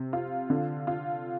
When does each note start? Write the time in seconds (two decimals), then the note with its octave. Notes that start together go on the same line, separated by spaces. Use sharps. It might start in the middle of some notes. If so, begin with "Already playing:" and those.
Already playing: C3
0.13 F4
0.50 D3
0.87 F4